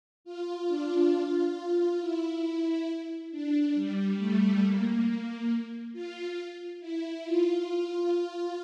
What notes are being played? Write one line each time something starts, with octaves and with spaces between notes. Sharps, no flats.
F4
D4
F4
E4
D4
G3
A3
A#3
F4
E4
F4